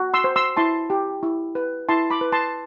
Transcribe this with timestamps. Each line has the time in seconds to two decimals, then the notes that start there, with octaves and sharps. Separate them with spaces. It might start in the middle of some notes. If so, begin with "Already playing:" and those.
Already playing: F#4
0.14 C6 E6
0.24 C5
0.36 C6 E6
0.57 E4 A5 C6
0.90 G4
1.23 E4
1.55 B4
1.89 E4 A5 C6
2.10 B5 D6
2.21 B4
2.32 A5 C6